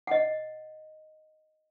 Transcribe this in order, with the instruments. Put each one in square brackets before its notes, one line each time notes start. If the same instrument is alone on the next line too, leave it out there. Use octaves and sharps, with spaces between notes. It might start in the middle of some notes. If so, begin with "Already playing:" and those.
[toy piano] D#5 F#5